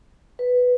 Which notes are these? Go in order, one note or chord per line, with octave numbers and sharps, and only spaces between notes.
B4